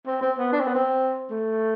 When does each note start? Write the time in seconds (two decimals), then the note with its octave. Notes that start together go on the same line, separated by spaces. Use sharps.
0.06 C4
0.21 C4
0.38 B3
0.52 D4
0.60 C4
0.67 B3
0.75 C4
1.30 A3